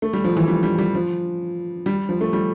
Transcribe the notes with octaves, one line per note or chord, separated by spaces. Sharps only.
A3
G3
F3
E3
G3
G3
G3
F3
G3
F3
A3
G3